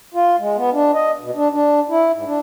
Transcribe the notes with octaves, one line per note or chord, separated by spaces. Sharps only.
F4
G#3
B3
D4
D#5
B2
D4
D4
E4
G#2
D4